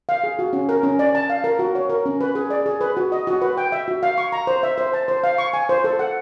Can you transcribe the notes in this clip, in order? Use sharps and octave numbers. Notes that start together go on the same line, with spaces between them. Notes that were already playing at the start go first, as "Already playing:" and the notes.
F5
G#4
F#4
C#4
A#4
C#4
D5
A5
F5
A#4
F#4
C#5
A#4
C#4
B4
G#4
D5
G#4
B4
F#4
D#5
F#4
B4
G5
E5
F#4
F5
C#6
A#5
C5
E5
C5
A5
C5
F5
C#6
G#5
C5
A4
F#5